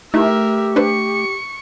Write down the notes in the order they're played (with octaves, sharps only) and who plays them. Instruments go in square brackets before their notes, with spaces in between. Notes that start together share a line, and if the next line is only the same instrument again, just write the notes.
[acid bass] A3 [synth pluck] D#4 E4 [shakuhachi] G4 [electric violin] A#4 E5
[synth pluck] D4 B4 C5 [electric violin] C#6 C#7